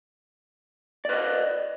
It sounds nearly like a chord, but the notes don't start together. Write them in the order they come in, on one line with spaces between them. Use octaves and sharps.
D5 B4 D#5